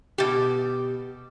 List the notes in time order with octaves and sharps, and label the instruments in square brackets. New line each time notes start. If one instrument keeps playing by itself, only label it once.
[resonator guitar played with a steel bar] B2 G4